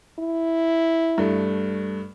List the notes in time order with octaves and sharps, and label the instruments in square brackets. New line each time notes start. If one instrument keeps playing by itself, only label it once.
[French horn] E4
[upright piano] G2 A3